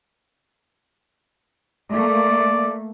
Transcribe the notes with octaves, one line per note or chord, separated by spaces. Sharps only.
A3 A#3 D5